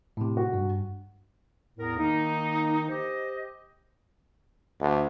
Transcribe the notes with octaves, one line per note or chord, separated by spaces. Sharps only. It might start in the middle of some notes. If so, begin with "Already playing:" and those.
A2 C3
F#4
G2
E2 A2 B3 A#4
D#3 A#3 D#4
G4 C5 D#5
D2